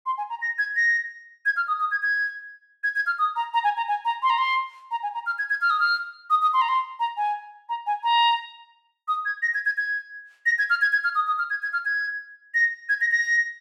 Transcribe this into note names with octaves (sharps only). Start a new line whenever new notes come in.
C6
G#5
A#5
A#6
G#6
A#6
G#6
F6
D#6
D#6
G#6
G#6
G#6
G#6
F6
D#6
A#5
A#5
G#5
A#5
G#5
A#5
C6
A#5
C6
A#5
G#5
A#5
F6
G#6
G#6
F6
D#6
F6
D#6
D#6
C6
A#5
C6
A#5
G#5
A#5
G#5
A#5
D#6
G#6
A#6
G#6
G#6
G#6
A#6
G#6
F6
G#6
G#6
F6
D#6
D#6
F6
G#6
G#6
F6
G#6
A#6
G#6
A#6
A#6